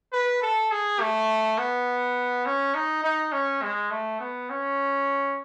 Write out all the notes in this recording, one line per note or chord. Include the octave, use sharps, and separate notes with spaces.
B4
A4
G#4
A3
B3
C#4
D#4
D#4
C#4
G#3
A3
B3
C#4